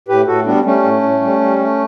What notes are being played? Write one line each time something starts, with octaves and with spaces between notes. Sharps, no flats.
A2 G4 B4
A2 F#4 A4
G3 B3 D4
G3 A3 C#4
A2
A2
G3
G3
A3